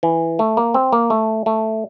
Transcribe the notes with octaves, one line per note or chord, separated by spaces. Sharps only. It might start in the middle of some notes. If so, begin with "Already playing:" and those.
E3
A3
A#3
C4
A#3
A3
A3